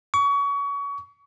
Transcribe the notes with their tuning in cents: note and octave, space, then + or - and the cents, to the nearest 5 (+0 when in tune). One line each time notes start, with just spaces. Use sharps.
C#6 +30